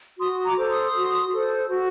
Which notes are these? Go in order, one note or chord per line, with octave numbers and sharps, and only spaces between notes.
F#4 C6 D#6
A#5 D6
A4 C5
C6 D#6
F#4
A4 C5
F#4